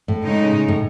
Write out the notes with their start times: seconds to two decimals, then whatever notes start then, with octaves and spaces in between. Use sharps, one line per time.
0.08 A2
0.23 C#3 G#3 D#4
0.68 A2